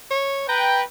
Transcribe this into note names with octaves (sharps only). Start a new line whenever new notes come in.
C#5
B4 G5 A#5